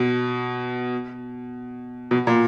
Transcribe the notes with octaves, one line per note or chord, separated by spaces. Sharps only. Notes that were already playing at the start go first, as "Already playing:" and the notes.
Already playing: B2
B2
A#2